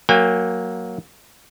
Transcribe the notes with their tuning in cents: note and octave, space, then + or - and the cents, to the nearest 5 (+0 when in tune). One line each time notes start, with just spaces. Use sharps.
F#3 +0 A#3 +0 G5 +45